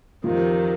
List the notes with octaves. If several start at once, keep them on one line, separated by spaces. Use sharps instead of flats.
F2 C3 D#3 F3